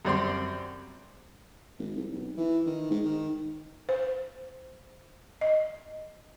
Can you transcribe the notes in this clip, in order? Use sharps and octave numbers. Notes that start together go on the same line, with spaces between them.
F#2 G3 C4 C6
G#1
C2
B1
E3
D#3
G#2
D#3
C5
D#5